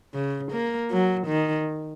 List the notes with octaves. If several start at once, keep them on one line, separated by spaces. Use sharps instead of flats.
C#3
A#3
F#3
D#3